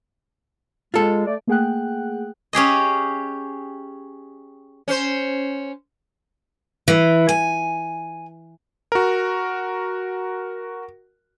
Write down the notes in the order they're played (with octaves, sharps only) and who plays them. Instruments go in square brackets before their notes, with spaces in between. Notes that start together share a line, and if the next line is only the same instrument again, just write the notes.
[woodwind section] G#3 [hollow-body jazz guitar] F4 A4
[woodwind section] A3 D5
[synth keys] A3 A#3 G#4 F#5 G5 F#6
[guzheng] C#4 G4 G#4 D#5
[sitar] C#4 C5
[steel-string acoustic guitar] E3
G#5
[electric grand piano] F#4 A#4